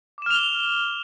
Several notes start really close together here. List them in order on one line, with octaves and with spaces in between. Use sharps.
D6 E7 F6 F7 G7